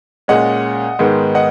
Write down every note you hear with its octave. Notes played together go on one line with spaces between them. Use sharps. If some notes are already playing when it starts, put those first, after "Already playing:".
A#2 G#3 C#4 D#5 F#5
G#2 D#3 G#3 B3
D#5 F#5